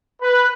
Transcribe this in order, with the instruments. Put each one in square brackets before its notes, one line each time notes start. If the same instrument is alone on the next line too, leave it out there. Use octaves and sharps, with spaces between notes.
[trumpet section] B4